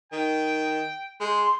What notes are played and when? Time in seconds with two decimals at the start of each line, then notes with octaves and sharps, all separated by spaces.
0.12 D#3 G5
1.20 G#3 C6